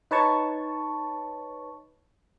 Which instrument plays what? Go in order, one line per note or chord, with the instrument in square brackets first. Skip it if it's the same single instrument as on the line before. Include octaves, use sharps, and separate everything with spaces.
[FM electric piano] D#4 B4 C#5 A5 C#6